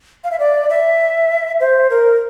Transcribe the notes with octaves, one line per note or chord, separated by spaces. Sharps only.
F5
E5
D5
E5
C5
A#4